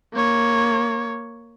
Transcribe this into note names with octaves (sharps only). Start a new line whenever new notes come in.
A#3 C#5